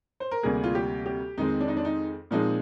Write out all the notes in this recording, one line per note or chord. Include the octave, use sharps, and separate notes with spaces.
C5
A#4
D2 C3 G3 A#3 G#4
F4
G4
G4
F2 D#3 G#3 C4 D#4
D4
D#4
D4
D#4
A#2 F3 G#3 C4 D#4